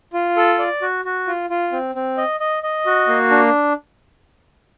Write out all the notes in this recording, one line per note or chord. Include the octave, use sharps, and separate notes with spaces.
F4
A4
D5
F#4
F#4
F4
F4
C4
C4
D#5
D#5
D#5
F#4
A#3
D4